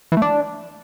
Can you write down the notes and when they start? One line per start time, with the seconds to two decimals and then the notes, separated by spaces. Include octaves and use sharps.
0.12 E3
0.17 A3
0.22 D4